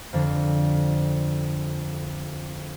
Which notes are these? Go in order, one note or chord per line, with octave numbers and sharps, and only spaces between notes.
F2 D3 D4